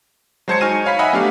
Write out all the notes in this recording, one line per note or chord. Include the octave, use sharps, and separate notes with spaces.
F#3 G#3 C5 A5 G#6 C#7
D#4 G#5 C#6 F6 A#6 D#7
C#5 F5 B5 B6
D#5 E5 F#5 G#5 B5
F#3 A3 B3 D4 G4 F5